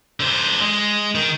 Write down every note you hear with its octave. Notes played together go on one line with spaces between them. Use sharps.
D3 C5
G#3
D#3